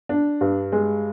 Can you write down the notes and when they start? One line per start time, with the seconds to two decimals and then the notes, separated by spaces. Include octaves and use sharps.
0.09 D4
0.41 G2
0.72 G#3